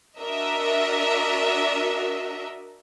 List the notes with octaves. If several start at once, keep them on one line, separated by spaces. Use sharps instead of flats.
D4 F#4 A#4 D#5 E5